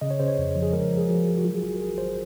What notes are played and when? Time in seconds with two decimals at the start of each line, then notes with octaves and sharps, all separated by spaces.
0.01 C#3 D#5
0.11 C#5
0.20 C#3 C5
0.28 C#5
0.38 F2
0.56 F3
0.62 G#4
0.73 G#3 A#4
0.90 F3
0.98 G#4
1.08 F3 F#4
1.27 G#3
1.38 F#4
1.44 F#3 F4
1.55 G#4
1.62 G#1 F#4
1.76 A#4
1.80 G#1 G#4
1.98 G#1 C5